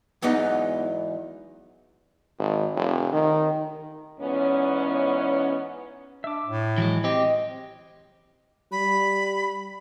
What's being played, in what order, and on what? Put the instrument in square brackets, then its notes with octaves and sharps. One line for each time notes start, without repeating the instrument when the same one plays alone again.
[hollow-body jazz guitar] E2 G#2 E3 F#3 B3 D#4
[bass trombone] G#1
F1
D#3
[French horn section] E2 G#2 B3 C#4
[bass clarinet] D4 [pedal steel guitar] E5 D6
[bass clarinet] A2
[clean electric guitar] E3 F#3 G#3
[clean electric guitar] C4 G4 [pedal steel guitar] D#5
[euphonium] G3 [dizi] B5